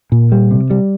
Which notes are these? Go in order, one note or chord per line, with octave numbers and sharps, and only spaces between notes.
A#2
G3
C3
G3